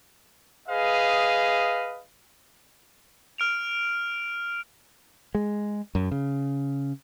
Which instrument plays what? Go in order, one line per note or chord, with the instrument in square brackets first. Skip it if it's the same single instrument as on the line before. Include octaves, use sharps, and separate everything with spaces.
[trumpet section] G#4 B4 D#5 F5
[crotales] F6 D7 F7
[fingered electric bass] G#3
F#2
C#3